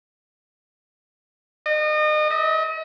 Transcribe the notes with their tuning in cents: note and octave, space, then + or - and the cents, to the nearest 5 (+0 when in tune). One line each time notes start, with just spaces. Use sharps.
D#5 -35
D#5 +40